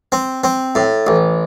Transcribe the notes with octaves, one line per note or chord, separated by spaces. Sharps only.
C4
C4
A2
A1